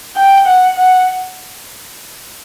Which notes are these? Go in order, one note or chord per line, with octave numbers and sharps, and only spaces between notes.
G5
F#5
F#5